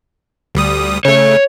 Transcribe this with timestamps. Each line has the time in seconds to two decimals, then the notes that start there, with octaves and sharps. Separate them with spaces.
0.55 D2 G3 D#6
1.05 C#3 A3 C#5